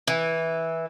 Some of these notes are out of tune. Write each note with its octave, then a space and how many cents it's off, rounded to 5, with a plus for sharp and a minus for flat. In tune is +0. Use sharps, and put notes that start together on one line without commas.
E3 -10